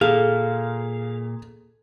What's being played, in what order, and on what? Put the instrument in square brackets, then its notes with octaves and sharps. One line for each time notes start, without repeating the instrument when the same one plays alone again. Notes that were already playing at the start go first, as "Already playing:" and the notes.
[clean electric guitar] A#2 [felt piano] G#4 [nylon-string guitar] A4 [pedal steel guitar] F5